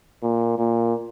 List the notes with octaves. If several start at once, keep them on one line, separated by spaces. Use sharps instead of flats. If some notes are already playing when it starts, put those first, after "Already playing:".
A#2
A#2